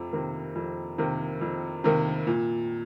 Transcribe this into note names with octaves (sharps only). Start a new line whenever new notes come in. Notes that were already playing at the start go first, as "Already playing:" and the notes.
Already playing: F2 C3
C3 D#3 A#3
F2
C3 D#3 A#3
F2
C3 D#3 A#3
A#2